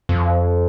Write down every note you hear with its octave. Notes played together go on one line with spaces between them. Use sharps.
F2